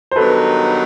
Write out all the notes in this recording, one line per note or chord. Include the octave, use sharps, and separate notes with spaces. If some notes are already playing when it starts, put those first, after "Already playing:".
C5
G2 D#3 F#3 B3 D#4 A4 B4